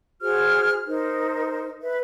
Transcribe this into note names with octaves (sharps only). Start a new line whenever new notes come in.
F#4 G#4 C5 F6
D#4 A#4 C5
B4 E5